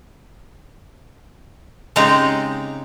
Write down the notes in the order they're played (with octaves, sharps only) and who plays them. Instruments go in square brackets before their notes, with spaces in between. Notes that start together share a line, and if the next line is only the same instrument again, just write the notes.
[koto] C#3 G#3 C4 D#4 G4 A#5